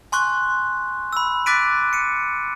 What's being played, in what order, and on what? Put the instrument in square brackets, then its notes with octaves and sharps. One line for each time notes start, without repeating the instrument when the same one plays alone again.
[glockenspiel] G#5 C6 C#6 F#6
B5 E6
D6 F#6 A6 B6 D7 D#7
C#7 D#7